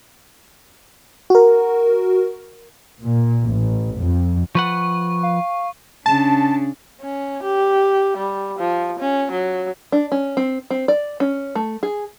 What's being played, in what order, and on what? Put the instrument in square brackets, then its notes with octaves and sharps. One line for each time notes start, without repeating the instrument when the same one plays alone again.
[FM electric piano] F#4 A#4
[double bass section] A#2
A1
F2
[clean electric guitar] F3 B4 F#5 [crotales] C#6
[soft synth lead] F5
[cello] C#3 D4 [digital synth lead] A5
[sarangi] C#4
G4
G3
F3
C#4
F#3
[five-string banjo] D4
C#4
C4
C4
D5
C#4
A3
G#4